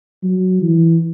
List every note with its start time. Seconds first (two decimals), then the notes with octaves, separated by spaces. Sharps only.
0.23 F#3
0.62 E3